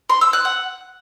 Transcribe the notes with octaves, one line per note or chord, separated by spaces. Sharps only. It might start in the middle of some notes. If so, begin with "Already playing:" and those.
C6
E6
F#6
F#5